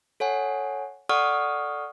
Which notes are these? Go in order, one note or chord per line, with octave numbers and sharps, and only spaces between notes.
A4 C#5 F#5 G#5
A4 D5 F#5 C#6 D#6 F6